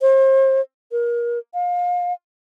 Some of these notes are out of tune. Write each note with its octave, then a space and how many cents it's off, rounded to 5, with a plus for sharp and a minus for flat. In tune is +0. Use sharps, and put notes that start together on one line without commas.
C5 +35
A#4 +30
F5 +30